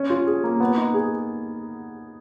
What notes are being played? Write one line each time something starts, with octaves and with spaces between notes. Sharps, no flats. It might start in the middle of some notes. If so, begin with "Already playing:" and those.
Already playing: C#4
F4
G#4
A#3
B3
D#4
G#4